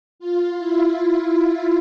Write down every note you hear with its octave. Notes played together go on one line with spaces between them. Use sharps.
F4
E4